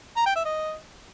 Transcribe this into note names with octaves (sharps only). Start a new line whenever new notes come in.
A#5
G5
E5
D#5